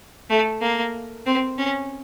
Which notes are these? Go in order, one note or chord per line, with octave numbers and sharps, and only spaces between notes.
A3
A#3
C4
C#4